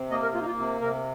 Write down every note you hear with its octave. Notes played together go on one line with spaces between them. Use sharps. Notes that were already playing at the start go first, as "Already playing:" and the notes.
Already playing: C3
A#3 D#5
A#4
A#3 F4
D#4
F4
C3
C3 A#4